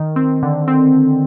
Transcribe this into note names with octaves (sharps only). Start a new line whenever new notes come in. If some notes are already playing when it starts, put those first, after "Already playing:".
Already playing: D#3
C4
D3
C4